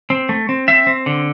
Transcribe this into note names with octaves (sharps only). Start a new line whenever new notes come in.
C4
A3
C4
C4 E5
C4
D3